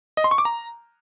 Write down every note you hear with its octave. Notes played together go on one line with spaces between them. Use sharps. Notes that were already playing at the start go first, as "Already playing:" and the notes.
D#5
C6
C#6
D6
A#5